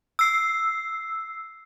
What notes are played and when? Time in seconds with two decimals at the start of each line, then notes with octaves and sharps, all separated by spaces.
0.19 E6 C7